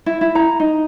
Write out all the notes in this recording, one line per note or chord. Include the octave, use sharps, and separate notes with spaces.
E4
E4
A#5
D#4